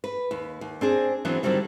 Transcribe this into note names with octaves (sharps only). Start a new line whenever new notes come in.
B4
D#2
D#2
C4 D4 G#4
E3 F#3 B3 C4 D4
D3 D#3 F#3 G3 C4